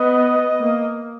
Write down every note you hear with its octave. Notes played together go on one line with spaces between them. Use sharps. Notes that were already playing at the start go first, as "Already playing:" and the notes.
Already playing: B3 D#5
A#3